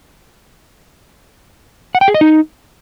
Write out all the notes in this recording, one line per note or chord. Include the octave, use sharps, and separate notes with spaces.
F#5
G5
G#4
D#5
D#4